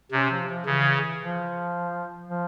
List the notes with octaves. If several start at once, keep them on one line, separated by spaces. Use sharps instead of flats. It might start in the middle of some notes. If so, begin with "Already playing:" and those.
C3 C#4
F3
F3
C#3 E3
F3
F3